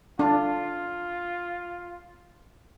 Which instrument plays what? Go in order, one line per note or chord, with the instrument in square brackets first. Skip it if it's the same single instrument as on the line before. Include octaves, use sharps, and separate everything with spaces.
[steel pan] D4 [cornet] F4